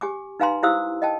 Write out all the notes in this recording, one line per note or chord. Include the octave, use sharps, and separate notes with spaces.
G4 G#5 D6
D#4 B4 F5 G#5 A#5 C6
E4 G4 C5 F5 D#6 E6
D#5 G5 A5